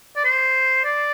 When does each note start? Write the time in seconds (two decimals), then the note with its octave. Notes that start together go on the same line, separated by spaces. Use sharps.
0.16 D5
0.25 C5
0.84 D5